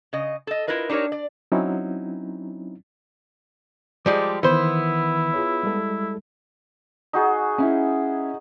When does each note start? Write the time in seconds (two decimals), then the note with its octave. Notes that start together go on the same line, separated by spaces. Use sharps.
0.13 C#3 D#5
0.47 A4 D#5
0.67 E4 F4 A#4 B4 D#5
0.89 D4 D#4 G4 A#4 C#5
1.12 D5
1.52 F#3 C4 C#4 D#4 E4
4.06 F3 G3 G#3 D6
4.43 D#3 E3 B3 E4 C5
5.34 F4 G#4 C#5
5.63 G3 G#3 A4
7.13 D#4 F#4 G#4
7.58 C#4 E4